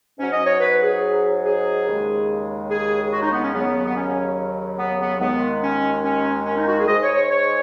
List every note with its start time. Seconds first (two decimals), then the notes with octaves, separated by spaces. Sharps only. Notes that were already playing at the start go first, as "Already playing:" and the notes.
0.18 G#2 F#3 C#4
0.32 D#5
0.46 C#5
0.61 B4
0.81 G#4
1.44 G#4
1.86 D#2 C#3 G#3
2.69 G#4
3.11 F#4
3.21 D#4
3.32 B3
3.42 C#4
3.53 D#2 C#3 F#3 B3
3.87 B3
3.95 C#4
4.79 B3
5.00 B3
5.20 D#2 D#3 G#3 B3
5.62 C#4
6.04 C#4
6.45 C#4
6.57 D#4
6.67 F#4
6.78 G#4
6.87 G#2 G#3 D#5
7.02 C#5
7.16 C#5
7.30 C#5